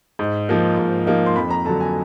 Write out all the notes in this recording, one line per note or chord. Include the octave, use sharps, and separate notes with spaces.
G#2
F3 A#3 D#4
G#2
F3 A#3 D#4
C6
F2 B5
A#5
D3 F#3 A5
G#5